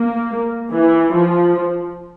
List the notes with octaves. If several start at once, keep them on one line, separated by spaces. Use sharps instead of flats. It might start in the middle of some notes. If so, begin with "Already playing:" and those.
Already playing: A#3
E3
F3